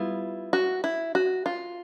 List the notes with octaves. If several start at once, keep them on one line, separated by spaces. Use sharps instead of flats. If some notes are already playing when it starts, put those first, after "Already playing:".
Already playing: G3 B3 E4 F4
F#4
E4
F#4
F4